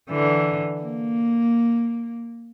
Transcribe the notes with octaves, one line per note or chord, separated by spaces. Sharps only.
D3 E3
A#3